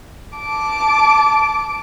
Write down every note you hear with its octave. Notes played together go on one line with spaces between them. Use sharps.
A5 D6